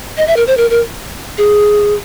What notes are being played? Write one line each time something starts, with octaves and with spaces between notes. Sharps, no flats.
D#5
E5
A#4
C5
A#4
A#4
G#4